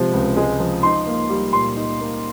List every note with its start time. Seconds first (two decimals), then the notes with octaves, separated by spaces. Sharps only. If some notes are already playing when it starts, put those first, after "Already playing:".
Already playing: C3 F3 G#3
0.13 C#2
0.37 G#3
0.60 F3
0.83 D#4 C6
1.07 A#3
1.30 G3
1.53 A#2 C6
1.76 D#4
2.00 A#3